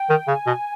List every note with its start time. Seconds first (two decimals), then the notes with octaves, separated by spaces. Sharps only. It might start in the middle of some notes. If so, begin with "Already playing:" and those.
Already playing: G5
0.09 D#3
0.27 C#3 G#5
0.47 B2